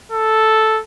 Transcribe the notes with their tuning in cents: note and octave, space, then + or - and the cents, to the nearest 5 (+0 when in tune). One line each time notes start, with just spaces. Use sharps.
A4 -5